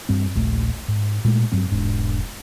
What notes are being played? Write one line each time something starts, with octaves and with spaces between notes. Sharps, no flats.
G2 G3 C4
D#1 A#1 A3
G#2
A#2 G#3 A3
G2 F#3 C4
E1 G#2 D4